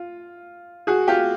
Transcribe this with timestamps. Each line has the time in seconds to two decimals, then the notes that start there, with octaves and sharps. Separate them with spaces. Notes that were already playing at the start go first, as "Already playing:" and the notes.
Already playing: F4
0.87 F#4 G#4
1.08 F4 G4